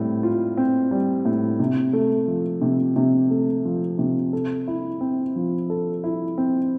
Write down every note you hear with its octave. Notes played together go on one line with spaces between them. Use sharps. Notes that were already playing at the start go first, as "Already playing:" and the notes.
Already playing: A2 G3 C4
F4
C4
G3
A2
C3
A3
F3
C3
C3
A3
F3
C3
A4
E4
C4
F3
A4
E4
C4